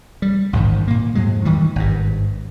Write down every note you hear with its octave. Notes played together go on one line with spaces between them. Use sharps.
G3
A1 G#2 D3 D#3
A#2 A#3
F2 G#2 F#3 G#3
D#3 E3 G3
G#1 G2